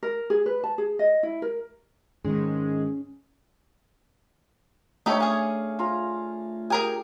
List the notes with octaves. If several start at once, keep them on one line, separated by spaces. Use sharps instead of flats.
A#4
G#4
B4
A5
G#4
D#5
E4
A#4
G#2 D#3 G#3 C#4
A3 D4 D#4 G4 A4 C#5
C#4 G#4 F5 G#5
F4 A#5
G4 G#4 A#4 G#5